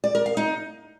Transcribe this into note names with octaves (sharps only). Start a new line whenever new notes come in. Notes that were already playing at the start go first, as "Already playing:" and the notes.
D5
A#4
F5
D#4